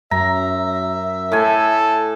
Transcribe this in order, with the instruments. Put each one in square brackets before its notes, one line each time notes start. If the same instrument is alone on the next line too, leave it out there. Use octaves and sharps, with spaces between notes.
[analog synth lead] F#2 [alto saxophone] E5 [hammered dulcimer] A#5
[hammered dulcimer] A2 G#5 [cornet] A4